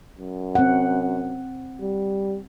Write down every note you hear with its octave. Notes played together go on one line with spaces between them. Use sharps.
F#2
C4 F#5
G3